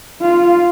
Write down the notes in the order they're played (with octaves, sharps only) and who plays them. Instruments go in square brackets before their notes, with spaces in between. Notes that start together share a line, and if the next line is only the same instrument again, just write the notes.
[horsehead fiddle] F4